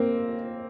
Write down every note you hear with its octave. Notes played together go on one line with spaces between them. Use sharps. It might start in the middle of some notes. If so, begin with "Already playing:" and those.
Already playing: A#3 C4